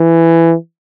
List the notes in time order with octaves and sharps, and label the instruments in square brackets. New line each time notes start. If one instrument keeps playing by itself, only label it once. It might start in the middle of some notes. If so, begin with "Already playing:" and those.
Already playing: [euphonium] E3